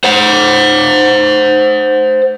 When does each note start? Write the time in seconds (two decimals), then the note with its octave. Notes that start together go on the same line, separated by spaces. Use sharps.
0.04 C5 F#5